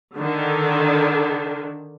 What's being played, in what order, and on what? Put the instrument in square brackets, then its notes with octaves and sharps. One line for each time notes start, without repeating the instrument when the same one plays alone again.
[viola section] D3 D#3